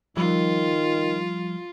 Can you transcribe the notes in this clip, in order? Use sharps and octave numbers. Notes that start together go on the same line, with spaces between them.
D#3 F3 G3 F4